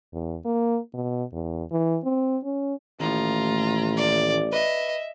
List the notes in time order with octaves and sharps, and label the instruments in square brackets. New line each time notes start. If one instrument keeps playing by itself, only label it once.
[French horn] E2
A#3
B2
E2
E3
C4
C#4
[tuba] A1 [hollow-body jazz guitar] D#2 A2 [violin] F4 A#5
[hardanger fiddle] D5
[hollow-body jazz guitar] B4 [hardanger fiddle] D#5 [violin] E5